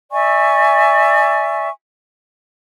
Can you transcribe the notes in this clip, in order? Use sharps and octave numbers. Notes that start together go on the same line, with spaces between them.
D5 E5 G#5 C#6